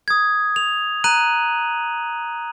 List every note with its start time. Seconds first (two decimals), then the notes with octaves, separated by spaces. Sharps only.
0.08 D#6 G#6
0.56 F7
1.04 A#5 F#6 D#7 F#7